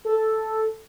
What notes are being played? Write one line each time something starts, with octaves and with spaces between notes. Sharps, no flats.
A4